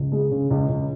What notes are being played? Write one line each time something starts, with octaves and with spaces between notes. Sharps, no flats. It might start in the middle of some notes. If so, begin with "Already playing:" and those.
Already playing: C#2
G#3
C#3
C#2
C#2